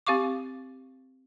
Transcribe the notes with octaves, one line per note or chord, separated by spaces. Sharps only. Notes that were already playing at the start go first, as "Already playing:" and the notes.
C4 G4 F5 C#6 D6